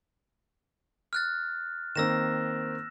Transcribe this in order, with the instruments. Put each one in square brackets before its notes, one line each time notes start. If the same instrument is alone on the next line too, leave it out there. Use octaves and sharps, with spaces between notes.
[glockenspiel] F6 F#6 A6
[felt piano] D#3 A#3 C4 [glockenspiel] E6 A#6 E7